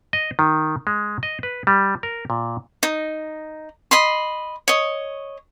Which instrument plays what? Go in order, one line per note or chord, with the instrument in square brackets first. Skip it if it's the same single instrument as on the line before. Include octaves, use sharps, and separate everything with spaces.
[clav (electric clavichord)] D#5
D#3
G#3
D#5
B4
G3
A#4
A#2
[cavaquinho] D#4
D#5 B5 C6
C#5 D#5